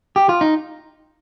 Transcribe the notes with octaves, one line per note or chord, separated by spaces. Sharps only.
G4
F4
D#4